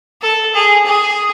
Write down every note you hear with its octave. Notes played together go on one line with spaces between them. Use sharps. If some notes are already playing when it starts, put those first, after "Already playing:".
A4
G#4
G#4